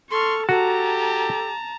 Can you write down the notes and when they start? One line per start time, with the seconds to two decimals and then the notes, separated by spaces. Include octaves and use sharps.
0.11 A4 C6 C#6 F6
0.49 F#4 G4 A4 A5 A#5